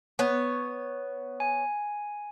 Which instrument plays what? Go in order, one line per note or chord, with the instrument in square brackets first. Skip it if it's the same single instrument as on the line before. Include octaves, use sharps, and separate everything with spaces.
[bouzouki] B3 C#5
[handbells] G#5